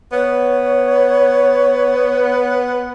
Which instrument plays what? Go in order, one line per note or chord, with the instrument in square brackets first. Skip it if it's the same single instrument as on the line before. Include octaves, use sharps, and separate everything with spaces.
[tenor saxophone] B3 [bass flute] C#5